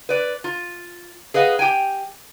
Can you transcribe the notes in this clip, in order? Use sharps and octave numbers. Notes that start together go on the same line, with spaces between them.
B4 D5
F4
G#4 B4 D#5 F5 F#5
G4 G5 G#5